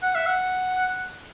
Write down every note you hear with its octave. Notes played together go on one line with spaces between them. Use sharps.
F#5
E5
F#5